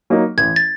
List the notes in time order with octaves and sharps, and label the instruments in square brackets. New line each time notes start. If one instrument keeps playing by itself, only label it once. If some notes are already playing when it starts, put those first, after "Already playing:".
[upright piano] F#3 A#3 D#4
[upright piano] A1 [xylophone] G#6
[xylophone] A6